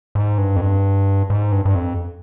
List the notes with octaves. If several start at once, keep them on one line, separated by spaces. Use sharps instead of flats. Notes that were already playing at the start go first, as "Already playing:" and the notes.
G#2
G2
F2
G2
G#2
G2
G2
F2